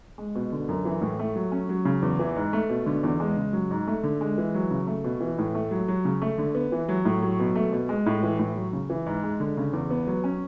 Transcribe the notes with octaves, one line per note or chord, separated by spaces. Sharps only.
G#3
B2
D3
F#2
E3
A2
A3
F#3
C#4
F#3
C#3
E2
E3
G#2
A3
B2
D3
E2
G#3
C#3
F#3
G#2
A3
D3
G#3
E3
F#3
C#3
A3
B2
E3
A2
A3
F#3
F#3
C#3
A3
D3
B3
E3
F#3
A2
F#3
B2
A3
B2
G#3
A2
E3
A2
F#3
C#3
E3
G#2
G#3
D3
C#3
E2
B3
F#3
C#4